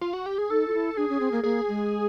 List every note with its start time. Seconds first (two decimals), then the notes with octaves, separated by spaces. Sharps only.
0.01 F4
0.13 F#4
0.26 G4
0.38 G#4
0.50 D#4 A4
0.68 F4
0.73 E4
0.97 D4 G#4
1.09 C#4
1.20 C4
1.32 A#3
1.43 A#3 G#4
1.68 G#3